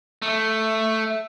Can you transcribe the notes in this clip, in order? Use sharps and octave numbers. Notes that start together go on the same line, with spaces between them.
A3